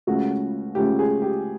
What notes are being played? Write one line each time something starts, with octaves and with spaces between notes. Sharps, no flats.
C#2 C#3 F3 A3 C#4 F#4
C#2 C#3 F3 A3 C#4 G4
G#4
G4